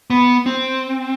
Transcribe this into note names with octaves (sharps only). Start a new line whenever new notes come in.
B3
C4